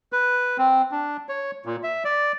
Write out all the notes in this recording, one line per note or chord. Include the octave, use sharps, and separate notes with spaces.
B4
C4
D4
C#5
A#2
E5
D5